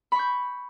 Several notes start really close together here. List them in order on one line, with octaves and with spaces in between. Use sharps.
B5 C#6 G6